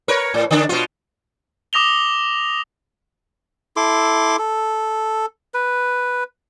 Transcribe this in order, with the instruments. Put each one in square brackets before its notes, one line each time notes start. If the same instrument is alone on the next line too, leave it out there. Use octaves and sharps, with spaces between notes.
[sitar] A#4 B4 C#5
A2
D3 D4
B2 F4
[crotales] D6 D#6 A#6 F7 G7
[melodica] E4 A4 C6 D6
A4
B4